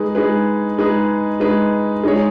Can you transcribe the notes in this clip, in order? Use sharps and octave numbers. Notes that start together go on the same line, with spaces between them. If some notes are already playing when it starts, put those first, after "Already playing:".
Already playing: G#3 D#4 G#4 B4
G#3 D#4 G#4 B4
G#3 D#4 G#4 B4
G#3 D#4 G#4 B4
G#3 D#4 G#4 C#5